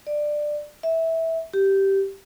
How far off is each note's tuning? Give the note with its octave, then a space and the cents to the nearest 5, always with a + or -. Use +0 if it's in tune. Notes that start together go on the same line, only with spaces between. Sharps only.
D5 +15
E5 -15
G4 -10